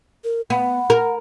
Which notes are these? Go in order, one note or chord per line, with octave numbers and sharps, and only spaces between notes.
A#4
B3 F#5
A#4